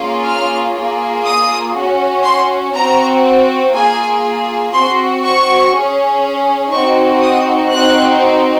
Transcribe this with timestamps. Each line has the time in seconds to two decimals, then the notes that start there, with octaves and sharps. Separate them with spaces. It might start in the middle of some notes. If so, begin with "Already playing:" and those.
Already playing: A#3 C#4 F4 G#4
0.24 F6
0.74 A#3 F4 G#4
1.24 D#6
1.74 C#4 F#4
2.23 C6
2.74 C4 F#4 A#5
3.73 A#3 F4 G#4 G#5
4.73 C4 F#4 C6
5.23 C#6
5.72 C#4 G#4
6.72 C4 D#4 F#4 C#6
7.22 D#6
7.71 C4 D#4 F#4 F#6